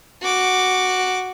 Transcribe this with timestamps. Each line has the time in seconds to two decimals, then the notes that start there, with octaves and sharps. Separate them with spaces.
0.22 F#4 D6